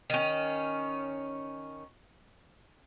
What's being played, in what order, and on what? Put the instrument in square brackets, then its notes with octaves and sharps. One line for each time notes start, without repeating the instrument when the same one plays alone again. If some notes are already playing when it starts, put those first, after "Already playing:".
[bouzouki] D#3 C#4